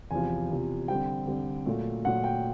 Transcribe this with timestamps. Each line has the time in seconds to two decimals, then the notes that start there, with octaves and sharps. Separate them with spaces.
0.11 E2 C3 F3 G#5
0.50 E2 C3 F3
0.88 D3 G3 C4 G5
1.27 D3 G3 C4
1.66 A#2 F#3 A3
2.05 A#2 F#3 A3 F#5
2.24 G5